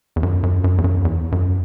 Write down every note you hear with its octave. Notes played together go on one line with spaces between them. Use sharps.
E2
F#2
F#2
F#2
E2
F#2
E2
F#2